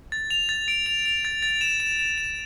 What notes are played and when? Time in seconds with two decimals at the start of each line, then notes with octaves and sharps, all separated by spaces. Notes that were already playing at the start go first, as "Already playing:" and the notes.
0.12 A6
0.30 F7
0.49 A6
0.68 D7
0.86 F7
1.06 F7
1.25 A6
1.42 A6
1.61 E7
1.80 E7
1.99 E7
2.18 E7